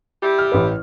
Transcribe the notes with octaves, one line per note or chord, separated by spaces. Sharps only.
G3 E4 G4
F6
A1 B4